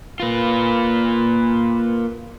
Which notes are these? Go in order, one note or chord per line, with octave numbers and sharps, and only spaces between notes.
A#3 F4 B4